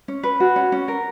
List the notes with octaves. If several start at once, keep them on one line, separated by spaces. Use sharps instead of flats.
C#4
B4
F#4
C#4
C#4
A#4